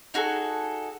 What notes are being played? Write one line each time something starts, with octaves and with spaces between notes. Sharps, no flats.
D#4 F#4 G#4 A4